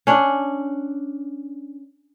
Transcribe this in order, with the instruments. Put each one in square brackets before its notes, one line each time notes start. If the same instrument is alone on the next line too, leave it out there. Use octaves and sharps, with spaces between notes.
[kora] C#4 D4